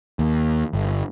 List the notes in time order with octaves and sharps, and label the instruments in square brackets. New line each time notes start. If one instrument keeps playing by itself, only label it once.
[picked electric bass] D#2
G1